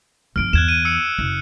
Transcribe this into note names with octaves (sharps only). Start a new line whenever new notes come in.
G1 F3 F6 D7
E2 F#6 G#6 E7
D#7
E6 C#7
F#1